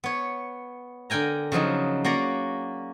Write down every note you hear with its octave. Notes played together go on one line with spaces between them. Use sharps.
B3 C#5
D3 A#4 G5 G#5 A#5
C#3 F3 F#3 D#4
A#3 C#4 F#4 D5 A#5